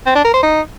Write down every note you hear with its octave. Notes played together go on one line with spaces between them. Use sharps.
C4
D4
A#4
C5
D#4